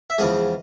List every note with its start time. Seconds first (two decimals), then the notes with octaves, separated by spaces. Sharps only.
0.10 E5
0.18 E2 C#3 F3 G#3 D#5